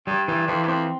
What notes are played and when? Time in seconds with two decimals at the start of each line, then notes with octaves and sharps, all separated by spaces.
0.07 G2 G3
0.28 G2 E3
0.47 F2 E3
0.63 G2
0.68 F2 C4